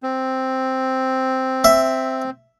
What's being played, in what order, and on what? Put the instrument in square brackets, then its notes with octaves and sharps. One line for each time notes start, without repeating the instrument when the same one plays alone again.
[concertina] C4
[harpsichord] E5